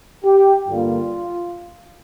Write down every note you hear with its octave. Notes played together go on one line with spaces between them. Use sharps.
G4
G2 D3 G3 A#3 F4